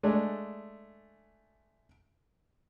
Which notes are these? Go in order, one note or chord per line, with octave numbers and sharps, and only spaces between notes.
G#3 A3 D4